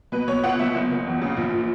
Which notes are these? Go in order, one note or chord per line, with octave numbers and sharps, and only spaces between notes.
B2 B4
B2 C#5
C#2 F#5
B2 E5
F#1
F#1
E2
C#3
A#1
A#2